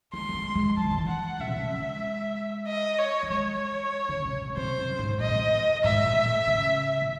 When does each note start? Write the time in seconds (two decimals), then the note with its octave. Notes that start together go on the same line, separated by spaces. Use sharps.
0.13 G#3 C6
0.29 A3
0.34 G#3
0.55 G#3
0.77 F#3 A5
0.84 E3
0.91 D#3
0.98 E3
1.09 F#5
1.40 C#3 E5
1.47 C3
1.56 C#3
1.72 G#3
2.67 D#5
2.99 C#5
3.23 F#3
3.30 G#3 C#5
4.09 C#3
4.25 C3
4.42 C3
4.57 C3 C5
4.78 F#2
4.99 G#2
5.20 A2 D#5
5.29 C3
5.36 A2
5.84 G#2 E5
6.06 A2
6.26 A2
6.47 C#3
7.01 A2